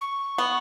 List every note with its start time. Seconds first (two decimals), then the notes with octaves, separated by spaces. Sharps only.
0.01 C#6
0.38 B3